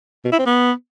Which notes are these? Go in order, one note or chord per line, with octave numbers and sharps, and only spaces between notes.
B2
E4
C4
B3